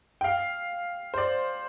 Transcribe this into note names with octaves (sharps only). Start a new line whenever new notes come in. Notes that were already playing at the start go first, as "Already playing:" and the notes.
G5
F5
C5
D5